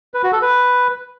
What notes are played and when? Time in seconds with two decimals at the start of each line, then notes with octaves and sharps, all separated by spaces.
0.14 B4
0.23 F#4
0.33 A4
0.42 B4